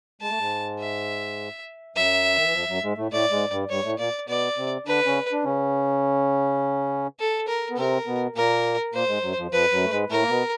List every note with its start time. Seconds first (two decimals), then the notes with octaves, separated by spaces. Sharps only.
0.21 G#3 A5
0.30 A3
0.39 G#2 G#3
0.79 E5
1.96 F#2 F#3 E5
2.36 D#3
2.45 E3
2.53 F2 F3
2.69 F#2 F#3
2.83 G#2 G#3
2.97 A2 A3
3.12 A2 A3 D5
3.31 G#2 G#3
3.51 G2 G3
3.70 G2 G3 C#5
3.84 A2 A3
3.99 A#2 A#3 D5
4.28 B2 B3 D5
4.57 C3 C4
4.87 D3 D4 B4
5.06 C#3 C#4
5.32 D4
5.44 C#3 C#4
7.20 A4
7.48 A#4
7.70 B3
7.77 C3 C4 A#4
8.07 B2 B3
8.36 A#2 A#3 A#4
8.93 A#2 A#3 C5
9.08 G#2 G#3
9.23 F#2 F#3
9.37 F2 F3
9.51 F2 F3 B4
9.72 F#2 F#3
9.84 A3
9.91 G#2 G#3
10.10 A2 A3 A#4
10.22 A#3
10.29 B2 B3